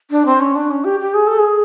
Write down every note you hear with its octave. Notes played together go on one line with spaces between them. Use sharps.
D4
C4
C#4
D4
C#4
G4
G4
G#4
A4
G#4